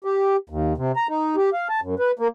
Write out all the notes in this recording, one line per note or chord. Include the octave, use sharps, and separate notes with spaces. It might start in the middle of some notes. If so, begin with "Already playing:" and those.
G4
D#2
C3
A#5
D#4
G4
F5
A5
F#2
B4
A#3